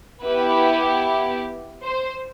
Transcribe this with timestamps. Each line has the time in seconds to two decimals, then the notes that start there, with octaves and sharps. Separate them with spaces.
0.24 B3 E4 G4 B4
1.83 C5